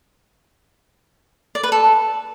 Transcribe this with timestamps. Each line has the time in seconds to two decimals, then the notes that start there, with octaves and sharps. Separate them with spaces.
1.55 D5
1.63 B4
1.72 A4